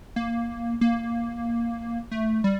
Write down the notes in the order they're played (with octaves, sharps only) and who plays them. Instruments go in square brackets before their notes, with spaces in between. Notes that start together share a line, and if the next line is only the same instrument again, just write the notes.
[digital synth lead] A#3
A#3
A3
G3